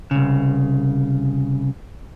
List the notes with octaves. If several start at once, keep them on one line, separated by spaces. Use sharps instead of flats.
C2 C#3